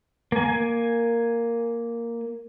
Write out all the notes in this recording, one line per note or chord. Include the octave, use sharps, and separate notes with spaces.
A#3 G#5